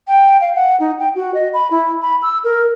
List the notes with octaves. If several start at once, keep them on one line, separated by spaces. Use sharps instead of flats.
G5
F5
F#5
D#4
G5
F#4
D#5
B5
E4
B5
E6
A#4